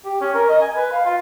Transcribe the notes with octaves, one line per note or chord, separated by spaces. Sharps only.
G4
C#4
A#4
D#5
G#5
B4
F5
F4